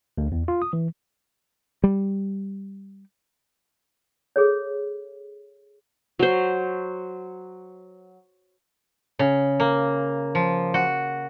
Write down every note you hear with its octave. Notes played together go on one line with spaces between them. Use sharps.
D2
E2
F4
D#6
E3
G3
G#4 A4 C#5
F#3 C5
C#3
A#3
F3
F#4